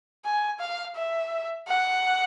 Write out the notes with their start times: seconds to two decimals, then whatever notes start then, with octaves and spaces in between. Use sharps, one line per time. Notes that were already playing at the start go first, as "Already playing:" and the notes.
0.25 G#5
0.60 F5
0.96 E5
1.68 F#5